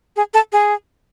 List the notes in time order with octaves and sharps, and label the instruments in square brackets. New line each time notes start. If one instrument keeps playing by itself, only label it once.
[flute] G#4
A4
G#4